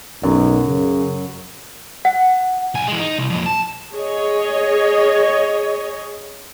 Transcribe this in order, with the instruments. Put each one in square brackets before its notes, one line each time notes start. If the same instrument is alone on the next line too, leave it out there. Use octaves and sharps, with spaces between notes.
[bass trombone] B1 [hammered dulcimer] F#2
[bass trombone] C#3
[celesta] F#5
[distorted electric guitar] B1 G#5
E3 G#3
D#4
C2
F2 A#2
A5
[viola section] G#4 C#5 D#5